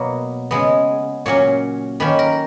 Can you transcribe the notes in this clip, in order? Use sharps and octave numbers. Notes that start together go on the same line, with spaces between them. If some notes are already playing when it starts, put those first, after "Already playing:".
Already playing: B2 F#3 A#3 B4 C#5
C#3 G#3 B3
A#2 F#3 C#4 C#5
D#3 A#3 C#4 B4
A#4